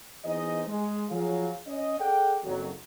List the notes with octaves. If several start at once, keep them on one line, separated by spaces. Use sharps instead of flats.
E3 B3 D#4 G#4 C5 D#5
G#3
F3 F#3 G#4 F5
C#4 D#5
G#4 A4 D5 F#5 G5
F#1 F2 F#3